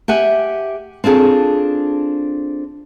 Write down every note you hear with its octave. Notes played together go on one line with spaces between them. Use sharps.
G4 E5 F#5 G#5
C4 D4 F4 G#4 A4